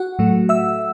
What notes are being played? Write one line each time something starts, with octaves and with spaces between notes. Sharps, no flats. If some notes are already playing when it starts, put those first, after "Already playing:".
Already playing: F#4 F#5
A2 F#3 A3
E5 E6